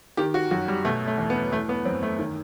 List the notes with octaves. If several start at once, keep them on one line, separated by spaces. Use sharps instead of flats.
D#3 G4
F#4
F#2 F#4
G3
B2 A3
A3
E2
B3
E3 A3
B3
F#2 C4
A3
D#3